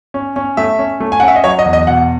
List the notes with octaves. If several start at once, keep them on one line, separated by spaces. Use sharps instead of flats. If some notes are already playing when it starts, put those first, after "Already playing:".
C#4
C#4
A3 E5
C#4
A3
G#5
C#4 F#5
E5
D#5
F#3 C#5
D#5
E2
D#5
B2 F#5